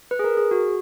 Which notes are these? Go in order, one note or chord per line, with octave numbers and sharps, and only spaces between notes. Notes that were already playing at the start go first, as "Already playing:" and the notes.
B4
G#4
A#4
G#4
F#4